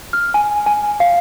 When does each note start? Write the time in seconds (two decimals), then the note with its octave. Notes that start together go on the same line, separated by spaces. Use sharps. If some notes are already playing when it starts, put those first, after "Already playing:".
0.13 F6
0.34 G#5
0.66 G#5
1.00 F5